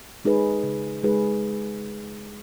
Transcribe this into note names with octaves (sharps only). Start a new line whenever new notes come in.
G#3 D#4 G#4 B4
C#3
G#3 D#4 G#4 B4